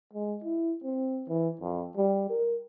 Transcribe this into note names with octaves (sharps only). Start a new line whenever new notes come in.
G#3
E4
C4
E3
F2
G3
A#4